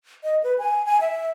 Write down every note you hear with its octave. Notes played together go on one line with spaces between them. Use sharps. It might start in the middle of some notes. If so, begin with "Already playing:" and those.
D#5
B4
G#5
G#5
E5